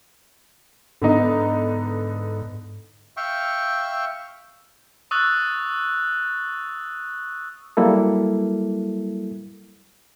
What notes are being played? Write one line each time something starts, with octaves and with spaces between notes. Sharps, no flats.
G#2 D3 B3 D#4
E5 F5 G5 C#6
C#6 D#6 E6 F#6 A6
F#3 G3 A#3 E4 A4